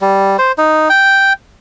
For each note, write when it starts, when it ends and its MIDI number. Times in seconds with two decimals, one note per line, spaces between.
0.01 0.37 55
0.38 0.52 72
0.58 0.88 63
0.90 1.33 79